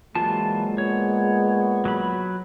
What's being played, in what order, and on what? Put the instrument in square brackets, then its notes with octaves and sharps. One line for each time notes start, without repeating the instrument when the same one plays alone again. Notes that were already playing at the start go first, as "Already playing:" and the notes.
[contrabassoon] A#2 [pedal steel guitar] E3 F4 A5 [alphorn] F#3 [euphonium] G#3
[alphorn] B3 [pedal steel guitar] C#5
[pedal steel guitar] F#3 B5